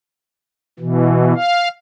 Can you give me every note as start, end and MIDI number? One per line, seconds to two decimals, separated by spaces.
0.79 1.34 47
0.79 1.34 52
1.36 1.68 77